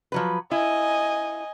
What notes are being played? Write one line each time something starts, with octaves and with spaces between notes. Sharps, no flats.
F3 F#3 B4
E4 D#5 G#5